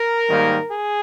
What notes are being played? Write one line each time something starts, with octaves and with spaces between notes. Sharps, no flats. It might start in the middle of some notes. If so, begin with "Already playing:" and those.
Already playing: A#4
G#2 D#3 G3 A#3
G#4